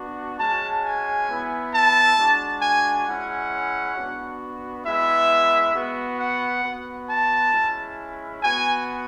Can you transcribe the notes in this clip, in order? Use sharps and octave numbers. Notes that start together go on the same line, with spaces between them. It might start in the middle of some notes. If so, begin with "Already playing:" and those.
Already playing: B3 D4 F#4
G#3 C#4 F#4 A5
G#5
B3 E4
A5
G#3 D4 F#4
G#5
G#3 C#4 E4 F#5
B3 D4 F#4
G#3 B3 E4 E5
B3 F#4
F#5
B3 F#4
A5
G#3 C#4 E4
B3 F#4 G#5